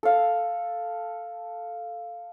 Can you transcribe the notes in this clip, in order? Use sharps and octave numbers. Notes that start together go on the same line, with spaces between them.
A4 F5